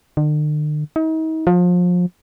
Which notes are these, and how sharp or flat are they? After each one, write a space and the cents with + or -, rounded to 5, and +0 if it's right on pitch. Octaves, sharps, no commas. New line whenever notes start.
D3 +45
D#4 +40
F3 +30